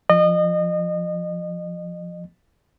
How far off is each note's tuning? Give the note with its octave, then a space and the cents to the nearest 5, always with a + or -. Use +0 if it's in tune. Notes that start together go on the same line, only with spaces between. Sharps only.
F3 +0 D#5 -30